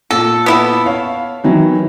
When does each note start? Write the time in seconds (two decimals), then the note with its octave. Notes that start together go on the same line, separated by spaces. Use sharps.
0.11 A#2 A4
0.46 B3 E4 A4
0.86 C#5 F5
1.44 D#3 E3 F#3